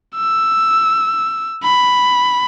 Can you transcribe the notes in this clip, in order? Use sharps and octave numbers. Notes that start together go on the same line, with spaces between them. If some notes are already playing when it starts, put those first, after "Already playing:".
E6
B5